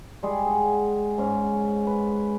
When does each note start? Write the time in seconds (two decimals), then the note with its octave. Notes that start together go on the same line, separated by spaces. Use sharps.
0.23 G3 G#3 G#4
0.46 G#4 F#5
1.18 G#2 C#4
1.87 B4